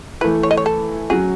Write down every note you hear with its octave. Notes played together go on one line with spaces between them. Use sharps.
E3 A3 E4 B4
C#5
D#5
C#5
A4
F#3 C#4 F#4 G#4